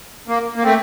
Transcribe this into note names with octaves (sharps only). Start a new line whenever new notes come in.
A#3
A#3
A3 C4